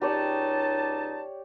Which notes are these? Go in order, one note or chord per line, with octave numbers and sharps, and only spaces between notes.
C#2 D#4 G4 C#5 D5 A5